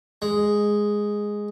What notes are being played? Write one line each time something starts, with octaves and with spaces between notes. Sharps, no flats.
G#3